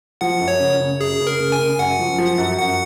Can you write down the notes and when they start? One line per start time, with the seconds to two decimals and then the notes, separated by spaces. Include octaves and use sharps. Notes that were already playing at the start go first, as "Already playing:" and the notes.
0.21 F3 F#5
0.41 F#2
0.48 C#5
0.60 C#3
0.81 C#3
1.00 F#2 G#4
1.20 C#3
1.27 A#4
1.40 C#3
1.52 G#5
1.59 C#3
1.79 F#2 F#5
1.99 F3
2.18 F3
2.38 F#2
2.57 F#2 F#5